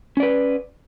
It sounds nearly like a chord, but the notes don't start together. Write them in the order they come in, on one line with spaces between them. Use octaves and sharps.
C#4 D5 B4